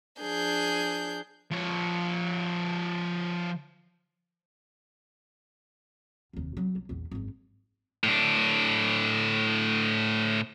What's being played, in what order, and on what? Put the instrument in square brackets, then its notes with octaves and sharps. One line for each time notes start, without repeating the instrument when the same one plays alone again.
[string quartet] F3 D4 G#4 G6
[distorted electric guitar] F3 C#5
[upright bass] F1 D#2
F#3 G3
B1
A#1 E2
G#1 F#2
[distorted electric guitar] A2 D4